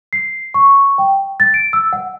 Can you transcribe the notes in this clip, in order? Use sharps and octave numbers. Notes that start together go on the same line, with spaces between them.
C7
C#6
G5
A6
D7
E6
F#5